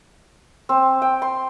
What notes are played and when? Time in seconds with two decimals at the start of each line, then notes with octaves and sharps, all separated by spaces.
0.69 C4
1.02 G5
1.22 C6